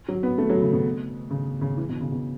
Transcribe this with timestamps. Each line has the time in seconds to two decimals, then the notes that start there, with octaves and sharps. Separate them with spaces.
0.08 F#3
0.23 B3
0.38 A3
0.50 F#3
0.62 C#3
0.73 B2
1.31 C#3
1.61 C#3
1.77 E3
1.89 B2
2.01 C#3
2.12 B2